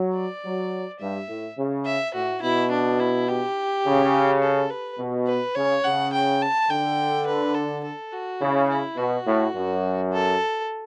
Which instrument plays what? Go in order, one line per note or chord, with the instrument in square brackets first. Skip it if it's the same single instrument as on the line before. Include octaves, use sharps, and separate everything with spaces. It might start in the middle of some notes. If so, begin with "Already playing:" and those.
Already playing: [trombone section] F#3
[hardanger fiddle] D5
[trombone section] F#3
[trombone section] G2 [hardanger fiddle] E5
[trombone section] A2
C#3
[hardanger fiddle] E5
[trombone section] A2 [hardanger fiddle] F#4
[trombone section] B2 [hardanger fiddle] E4
[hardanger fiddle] D4
E4
G4
[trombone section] C#3
[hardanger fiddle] A4
B4
[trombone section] B2
[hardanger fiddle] B4
[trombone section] C#3 [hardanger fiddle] C#5
[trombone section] C#3 [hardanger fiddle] F#5
[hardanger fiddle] G5
A5
[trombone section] D3 [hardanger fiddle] G5
[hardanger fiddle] B4
A4
A4
F#4
[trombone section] C#3 [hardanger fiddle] E4
[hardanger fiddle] E4
[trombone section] B2 [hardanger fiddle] F#4
[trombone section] A2
F#2
[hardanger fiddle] A4